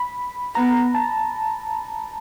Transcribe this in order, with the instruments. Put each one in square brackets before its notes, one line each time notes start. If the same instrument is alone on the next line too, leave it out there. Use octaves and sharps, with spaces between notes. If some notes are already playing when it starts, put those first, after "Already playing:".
Already playing: [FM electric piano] B5
[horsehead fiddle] B3 [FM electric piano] A#5
[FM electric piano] A5